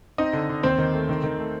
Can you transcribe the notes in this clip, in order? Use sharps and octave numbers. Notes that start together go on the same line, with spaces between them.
C4 D#4 D#5
D3
D3
D#2 C4 C5
D#3
A3
D#3
D#3
A3